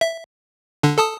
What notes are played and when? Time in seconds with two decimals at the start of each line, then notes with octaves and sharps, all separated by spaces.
0.01 E5
0.83 D3 D4
0.98 A4 A5 D#6